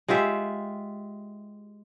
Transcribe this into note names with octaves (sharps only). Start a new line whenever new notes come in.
G#3 F4 G4 E5